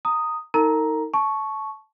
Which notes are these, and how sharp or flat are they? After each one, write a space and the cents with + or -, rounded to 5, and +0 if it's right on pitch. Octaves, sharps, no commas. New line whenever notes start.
A#5 -15 D#6 +0
D#4 +25 A#4 -40 A#5 +5
A5 -15 C#6 +0